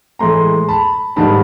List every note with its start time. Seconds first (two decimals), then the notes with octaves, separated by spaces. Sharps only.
0.19 A2 E3 G#3 A#5 C6
0.69 A5 B5
1.16 G#2 D#3 G3 A5 B5